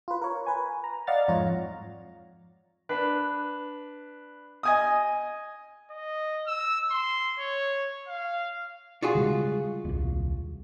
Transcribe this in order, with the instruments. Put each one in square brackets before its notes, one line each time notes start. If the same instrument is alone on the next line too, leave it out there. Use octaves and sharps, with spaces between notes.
[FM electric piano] F4 B4
A#4 C#5
B4 G#5
A#5
D5 D#5 F5 F#5 F6 A6
F2 G#2 F4 C#5 A#5
[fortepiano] D4 B4
D#5 G#5 D#6
[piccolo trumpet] D#5
E6
C6
C#5
F5
[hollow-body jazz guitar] F4 F#4 G#4
[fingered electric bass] C#3 G3 G#3
D#1 C2